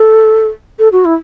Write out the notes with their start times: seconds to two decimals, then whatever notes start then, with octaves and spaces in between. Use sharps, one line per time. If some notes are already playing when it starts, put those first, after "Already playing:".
Already playing: A4
0.79 A4
0.92 F#4
1.05 E4